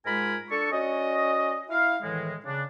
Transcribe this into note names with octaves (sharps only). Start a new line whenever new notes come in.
G#2 G#3 F4 A#4 G#5 B5
D4 A4 C#6
C#4 F#4 D5 D#5
E4 F5
A2 D#3 E3 G#3
C#3 D4